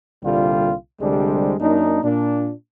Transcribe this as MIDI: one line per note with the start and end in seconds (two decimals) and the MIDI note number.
0.23 0.73 36
0.23 0.73 46
0.23 0.73 50
0.23 0.73 55
0.23 0.73 65
1.00 1.54 36
1.00 1.54 50
1.00 1.54 55
1.00 1.54 56
1.00 1.54 62
1.00 1.54 72
1.60 2.00 42
1.60 2.00 58
1.60 2.00 62
1.60 2.00 63
2.03 2.52 46
2.03 2.52 62